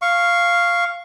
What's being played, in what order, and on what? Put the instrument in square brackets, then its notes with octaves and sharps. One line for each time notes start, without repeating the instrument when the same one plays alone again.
[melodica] F5 C#6